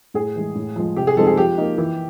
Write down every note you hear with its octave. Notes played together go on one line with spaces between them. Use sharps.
A2 G#4
E3 G#3
A2
F3 G#3
C3 G4
G#4
F3 G#3 C4 D#4 A4
G#4
F3 G4
A#3 D#4
E3